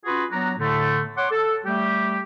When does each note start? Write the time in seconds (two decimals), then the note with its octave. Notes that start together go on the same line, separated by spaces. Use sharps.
0.05 C#4 F4 F#4 G#4 B4
0.31 F#3 B3 D4 F#4 A#5
0.59 A2 D3 A3
1.17 C#5 F#5 C6 D6
1.31 A4
1.65 G3 A3 G4